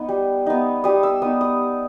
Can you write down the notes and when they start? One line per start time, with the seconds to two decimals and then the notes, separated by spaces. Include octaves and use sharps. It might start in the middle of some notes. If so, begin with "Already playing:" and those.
Already playing: B3 D#4
0.09 G3
0.46 B3 D#4
0.84 G3 D#6
1.03 E6
1.22 B3 D#4 D#6
1.41 D#6